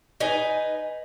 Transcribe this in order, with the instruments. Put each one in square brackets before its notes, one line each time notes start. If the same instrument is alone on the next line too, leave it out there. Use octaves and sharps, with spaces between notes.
[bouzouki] D#4 B4 G#5